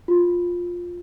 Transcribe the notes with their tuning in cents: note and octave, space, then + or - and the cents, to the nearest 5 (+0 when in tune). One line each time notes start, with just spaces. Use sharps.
F4 +10